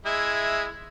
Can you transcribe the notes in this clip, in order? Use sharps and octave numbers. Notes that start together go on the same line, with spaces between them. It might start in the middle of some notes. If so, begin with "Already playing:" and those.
G#3 E4 E5